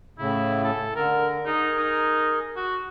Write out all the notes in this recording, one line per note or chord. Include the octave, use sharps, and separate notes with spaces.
A2 C#3 E4
A4
D3 A#4
D#4 G#4 A#4
D#4
F#4